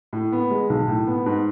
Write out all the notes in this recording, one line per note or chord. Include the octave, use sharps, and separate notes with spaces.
A2
B3
G#3
B1
A2
B3
G#2